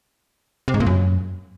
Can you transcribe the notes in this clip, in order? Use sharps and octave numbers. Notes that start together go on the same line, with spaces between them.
C3
G#2
A#2
F#2